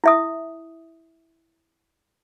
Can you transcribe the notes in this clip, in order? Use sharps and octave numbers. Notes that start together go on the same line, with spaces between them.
E4 E5 D#6